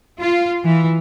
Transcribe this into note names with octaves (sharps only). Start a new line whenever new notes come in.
F4
E3